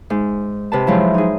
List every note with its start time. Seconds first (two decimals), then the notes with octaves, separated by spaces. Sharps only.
0.10 G#2
0.72 C3 B4 A5
0.87 G#2 F3 F#3 E4
1.14 D#4 G#4